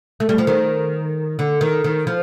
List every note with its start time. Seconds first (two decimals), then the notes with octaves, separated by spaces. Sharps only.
0.20 A3
0.29 G3
0.38 F3
0.47 D#3
1.39 D3
1.61 D#3
1.84 D#3
2.07 F3